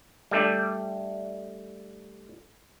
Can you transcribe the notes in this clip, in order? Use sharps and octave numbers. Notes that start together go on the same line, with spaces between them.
G3 A3 D4